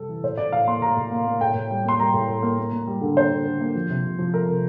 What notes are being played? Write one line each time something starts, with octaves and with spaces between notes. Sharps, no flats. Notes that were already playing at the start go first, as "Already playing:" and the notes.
Already playing: C3 G3 A4
E3
A2 C5
A2 D5
A2 F5
A#3 C6
A2 A#5
A2
A#3
A#3
A2 G5
A2
G3
A#3 C6
G3 A#5
A2
A2
A#3
A#3
A#3
G3
D3
A#3 C5
D3
D3
A#3
F3
C3
C3
F3
A3 A#4
C3